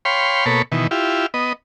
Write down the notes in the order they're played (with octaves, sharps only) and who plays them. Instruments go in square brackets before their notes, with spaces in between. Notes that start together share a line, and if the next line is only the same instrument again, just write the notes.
[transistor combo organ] C#5 F5 G5 B5 C6
B2 A#3 A4 C#5 B5
B2 D#3 E3
E4 F4 G4
B3 D#5